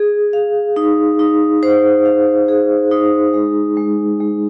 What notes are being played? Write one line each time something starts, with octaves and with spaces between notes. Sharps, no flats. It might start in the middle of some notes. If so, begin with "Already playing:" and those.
Already playing: G#4
F5
D#4
D#4
C5
F5
G#4
D#4
G#3
G#3
G#3